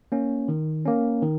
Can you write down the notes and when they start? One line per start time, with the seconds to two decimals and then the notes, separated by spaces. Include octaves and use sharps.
0.12 A#3 C#4
0.48 D#3
0.85 A#3 C#4
1.22 D#3